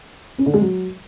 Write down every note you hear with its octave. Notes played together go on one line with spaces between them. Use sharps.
C#4
D3
G#3
F#3